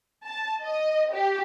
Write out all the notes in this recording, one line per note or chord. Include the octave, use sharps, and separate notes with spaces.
A5
D#5
G4